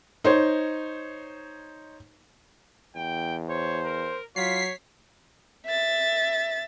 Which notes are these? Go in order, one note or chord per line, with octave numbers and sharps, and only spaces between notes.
D#4 C5 C#5
E2 G5
C5 C#5
A#4
F#3 F4 C#5 B6 C7
E5 A6